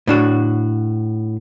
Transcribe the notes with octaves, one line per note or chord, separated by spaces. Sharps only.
A2 D4 F#4